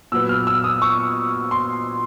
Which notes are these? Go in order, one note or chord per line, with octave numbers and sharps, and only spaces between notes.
A#2 F#3 B3 E6
F6
E6
D#6
C#6
C6